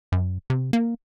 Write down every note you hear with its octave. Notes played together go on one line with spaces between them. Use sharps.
F#2
C3
A#3